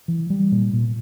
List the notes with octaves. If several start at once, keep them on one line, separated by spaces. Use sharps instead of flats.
E3
G3
A#2
A#2